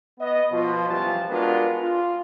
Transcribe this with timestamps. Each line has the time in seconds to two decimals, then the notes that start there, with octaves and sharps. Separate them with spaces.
0.19 B3 D#5
0.51 B2 F3 F4
0.88 F#2 E3 F3 G3 C5 A5
1.30 G#3 B3 D4 F4 F#4 A#4
1.81 F4